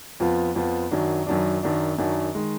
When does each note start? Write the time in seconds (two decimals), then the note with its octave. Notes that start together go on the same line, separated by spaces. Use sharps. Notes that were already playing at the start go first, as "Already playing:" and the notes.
0.20 F2 F3 B3 F4
0.55 F2 F3 B3 F4
0.91 F#2 D#3 F#3 D4
1.27 F#2 D#3 F#3 D4
1.63 F#2 D#3 F#3 D4
1.98 F#2 D#3 F#3 D4
2.35 D#3 G#3